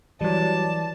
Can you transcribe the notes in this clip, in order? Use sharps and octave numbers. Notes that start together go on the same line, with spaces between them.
E3 F#3 G3 D5 A5